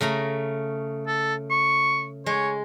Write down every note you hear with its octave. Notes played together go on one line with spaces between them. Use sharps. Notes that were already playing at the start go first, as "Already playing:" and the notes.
C#3 A3 A#5
A4
C#6
G#3 C#5